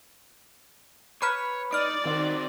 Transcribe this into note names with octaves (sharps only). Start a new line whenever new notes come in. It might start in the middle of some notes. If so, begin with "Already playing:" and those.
B4 C#5 A#5 B5 F6
D#4 D5 F6 D7
D#3 C4 F#4